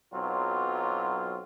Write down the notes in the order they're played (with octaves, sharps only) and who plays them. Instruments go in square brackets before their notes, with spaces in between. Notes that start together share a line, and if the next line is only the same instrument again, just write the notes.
[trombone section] B1 F#3 C4 F4